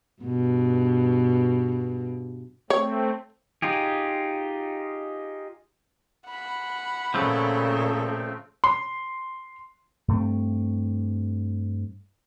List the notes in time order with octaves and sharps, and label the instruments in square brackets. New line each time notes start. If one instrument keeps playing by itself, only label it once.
[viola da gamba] G2 B2
[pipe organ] A3 C4 [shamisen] C#5
[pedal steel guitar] D#4 F4 G4 G#4
[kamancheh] F#5 B5
[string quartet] A#2 C#3 A4 [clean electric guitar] F3 A3 C4
[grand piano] C6
[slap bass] G2 A3 C4